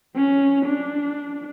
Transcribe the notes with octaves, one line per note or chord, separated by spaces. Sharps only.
C#4
D4